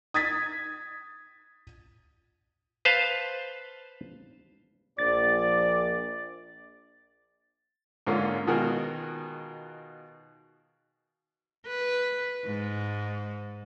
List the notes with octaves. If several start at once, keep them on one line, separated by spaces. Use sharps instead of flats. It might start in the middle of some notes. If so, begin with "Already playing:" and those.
D#6 G#6 A6 B6
B4 C5 F5 A5
A#1 D5 A6
G#2 D3 A#3 C#4 F4
B2 D#3 F4 F#4 G#4 A#4
B4
G#2